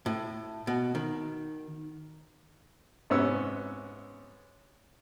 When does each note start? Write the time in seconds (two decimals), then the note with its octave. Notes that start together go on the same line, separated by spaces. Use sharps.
0.06 A2
0.67 B2
0.95 D#3
3.10 G#2 C3 B3 C#4 E6